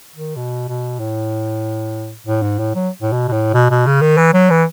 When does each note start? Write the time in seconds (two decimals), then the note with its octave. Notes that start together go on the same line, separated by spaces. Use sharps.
0.15 D#3
0.36 B2
0.68 B2
0.99 A2
2.27 A2
2.42 G#2
2.59 A2
2.75 F#3
3.02 A2
3.12 B2
3.28 B2
3.33 A2
3.54 B2
3.70 B2
3.86 C#3
4.01 D#3
4.17 E3
4.33 F#3
4.50 E3